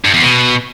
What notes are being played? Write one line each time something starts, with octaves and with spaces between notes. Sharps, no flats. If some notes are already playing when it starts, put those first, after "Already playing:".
G2
E2
B2